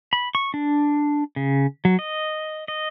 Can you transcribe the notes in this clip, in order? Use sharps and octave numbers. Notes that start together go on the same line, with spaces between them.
B5
C#6
D4
C#3
F#3
D#5
D#5